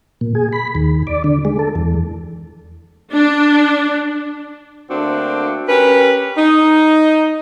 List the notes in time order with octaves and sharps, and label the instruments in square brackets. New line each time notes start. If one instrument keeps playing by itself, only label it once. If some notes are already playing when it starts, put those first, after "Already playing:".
[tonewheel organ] A#2
G#4
B5
D#2
D5
D3
G#3
A4
E2
[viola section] D4
[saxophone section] D3 A3 A#3 C4 D4 F#4
C#4 G4 A#4 B4
D#4